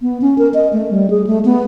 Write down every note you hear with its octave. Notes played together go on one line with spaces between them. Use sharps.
B3
C#4
A#4
D#5
A3
G3
G#4
A3
B3